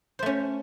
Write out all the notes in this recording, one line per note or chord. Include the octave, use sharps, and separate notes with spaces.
A3 C#4 C5